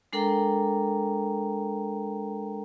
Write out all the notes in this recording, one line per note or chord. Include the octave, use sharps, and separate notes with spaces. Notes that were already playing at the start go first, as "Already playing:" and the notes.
G#3 D4 A4 A#4 G5 A#5